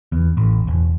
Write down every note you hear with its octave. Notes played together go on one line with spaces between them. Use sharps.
E2
A1
E1